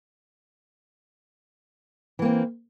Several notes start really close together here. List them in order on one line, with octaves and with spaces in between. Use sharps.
E3 A#3 C4